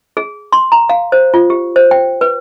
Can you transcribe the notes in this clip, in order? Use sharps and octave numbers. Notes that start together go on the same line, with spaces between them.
G#4
C6
A#5
F5
C5
F4
G4
C5
G5
B4